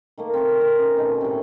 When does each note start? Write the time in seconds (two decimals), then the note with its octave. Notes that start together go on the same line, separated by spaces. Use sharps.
0.17 D#3 A3 A#3
0.34 C4 A#4 C#5
0.60 C5 A#5
0.77 C#4
0.97 B2 D#3 A3
1.21 A2 C3